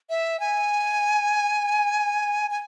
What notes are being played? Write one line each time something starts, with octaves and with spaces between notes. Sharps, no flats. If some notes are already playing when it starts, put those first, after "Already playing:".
E5
G#5
G#5